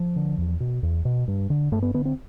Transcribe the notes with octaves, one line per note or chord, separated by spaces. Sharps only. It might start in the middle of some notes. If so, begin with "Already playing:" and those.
Already playing: F3
D3
E2
B2
E2
B2
G2
D3
G2 A3
B3
D3 B3
C4